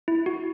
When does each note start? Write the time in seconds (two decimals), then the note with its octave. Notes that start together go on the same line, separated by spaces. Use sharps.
0.08 E4
0.26 F#4